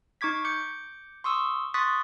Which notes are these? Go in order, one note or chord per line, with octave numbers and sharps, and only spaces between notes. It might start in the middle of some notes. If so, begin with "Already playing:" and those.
D#4 C#6 D6 G#6 B6
D6 G6 C#7
C6 C#6 D#6 E6
C6 C#6 D#6 F#6 A6 B6